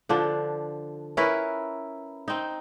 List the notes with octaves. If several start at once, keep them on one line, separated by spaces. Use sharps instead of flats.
D3 F3 D4
C#4 E4 A#4 B4
C4 D#4